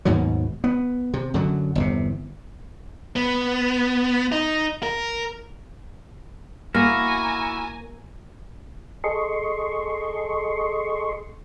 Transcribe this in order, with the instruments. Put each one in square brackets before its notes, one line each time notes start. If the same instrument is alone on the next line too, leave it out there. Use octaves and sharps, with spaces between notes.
[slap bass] D#2 G#2 B2 F#3
B3
C3
F#2 D3 F#3
G1 E2 C3
[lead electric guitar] B3
D#4
A#4
[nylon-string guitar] A#3 [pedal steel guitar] E4 F#4 [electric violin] G#5 A#5 [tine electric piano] F6 A#6
[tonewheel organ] G#4 A4 D#5 C6 C#6